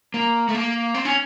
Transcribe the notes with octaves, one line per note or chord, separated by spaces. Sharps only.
A#3
A3
A#3
C4
C#4